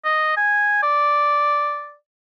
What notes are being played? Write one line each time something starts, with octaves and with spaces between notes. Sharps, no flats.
D#5
G#5
D5